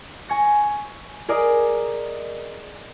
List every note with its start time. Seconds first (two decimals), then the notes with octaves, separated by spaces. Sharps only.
0.29 G#5 C#6 A#6
1.29 G#4 A#4 D5 D#5